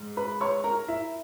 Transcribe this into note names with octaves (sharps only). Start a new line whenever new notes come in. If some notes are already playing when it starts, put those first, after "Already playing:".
Already playing: G#2
B4 B5
C#5 C#6
A#4 A#5
E4 E5